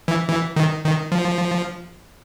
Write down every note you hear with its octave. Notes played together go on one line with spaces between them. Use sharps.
E3
E3
D#3
D#3
F3